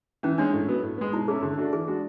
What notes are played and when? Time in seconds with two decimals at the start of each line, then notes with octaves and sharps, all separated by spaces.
0.23 E3 C#4
0.38 G#3 C#4 D4
0.53 A2
0.68 F#3 B3
0.83 A2
0.98 G#3 B3
1.13 B2 E4
1.28 A3 C#4 E4 G#4
1.42 D3
1.58 A3 D4 F#4
1.72 E3 G#4
1.88 G#3 D4 F#4